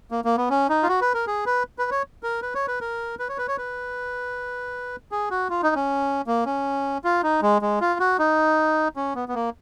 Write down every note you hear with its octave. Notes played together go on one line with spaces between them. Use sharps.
A#3
A#3
B3
C#4
D#4
F4
F#4
B4
A#4
G#4
B4
B4
C#5
A#4
B4
C#5
B4
A#4
B4
C#5
B4
C#5
B4
G#4
F#4
F4
D#4
C#4
A#3
C#4
F4
D#4
G#3
G#3
F4
F#4
D#4
C#4
B3
B3
A#3